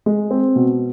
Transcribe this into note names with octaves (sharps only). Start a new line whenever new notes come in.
G#3
C4
B2